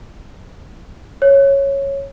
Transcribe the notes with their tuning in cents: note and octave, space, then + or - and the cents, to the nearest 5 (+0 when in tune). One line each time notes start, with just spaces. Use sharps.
C#5 -5